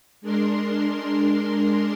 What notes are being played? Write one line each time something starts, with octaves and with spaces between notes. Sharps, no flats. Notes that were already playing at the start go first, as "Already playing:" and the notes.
G#3 D4 A#4 C6